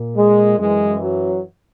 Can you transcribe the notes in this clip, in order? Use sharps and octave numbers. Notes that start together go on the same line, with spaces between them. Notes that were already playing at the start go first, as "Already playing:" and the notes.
Already playing: A#2
G#3
F#2 E3 G#3
F#3